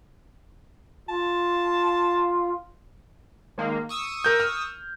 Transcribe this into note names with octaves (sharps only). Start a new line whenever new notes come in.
F4 A5
D#3 G#3 A#3
C#6 D#6 E6
A#4 G6
F6